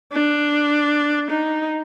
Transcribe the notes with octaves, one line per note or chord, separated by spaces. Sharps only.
D4
D#4